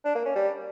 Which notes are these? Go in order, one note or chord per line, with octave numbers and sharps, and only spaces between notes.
D4
A#3
C#4
G3